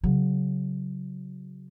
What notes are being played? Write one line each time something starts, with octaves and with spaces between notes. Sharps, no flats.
C#3 F#3